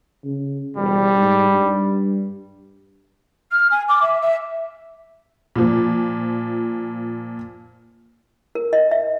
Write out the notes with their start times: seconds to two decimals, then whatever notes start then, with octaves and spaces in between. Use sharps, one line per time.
0.24 C#3
0.77 E1 G3
1.17 G#2
1.51 G2
3.52 F6
3.71 G#5
3.88 D6
4.02 E5
4.21 E5
5.56 A#2 F3
8.55 A#4
8.73 D#5
8.91 E5